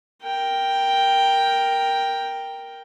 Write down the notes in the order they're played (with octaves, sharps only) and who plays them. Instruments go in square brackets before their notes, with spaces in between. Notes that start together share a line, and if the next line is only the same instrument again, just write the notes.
[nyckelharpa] A#4 G5